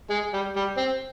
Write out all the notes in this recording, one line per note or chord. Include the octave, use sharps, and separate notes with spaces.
G#3
G3
G3
C4